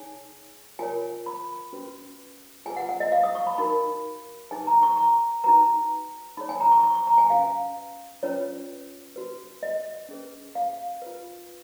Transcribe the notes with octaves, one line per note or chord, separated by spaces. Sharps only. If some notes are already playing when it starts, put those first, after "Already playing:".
Already playing: D#4 G#4 C#5 G#5
F4 A#4 C#5 G#5
B5
C#4 F#4 B4
F4 G#4 B4 G#5
F#5
F#5
D#5
F5
D#6
C#6
B5
D#4 F#4 A#4 B5
D#4 G#4 B4 G#5
A#5
C#6
A#5
D#4 F#4 B4 A#5
D#4 G#4 C#5 B5
G#5
A#5
C#6
C#6
C#6
A#5
G#5
C#4 F#4 B4 F5
C#4 F4 B4 C#5
F#4 B4
D#5
C#4 G#4 B4
F5
F4 B4